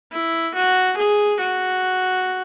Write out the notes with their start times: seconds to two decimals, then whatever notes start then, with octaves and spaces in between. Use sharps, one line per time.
0.12 E4
0.55 F#4
0.97 G#4
1.40 F#4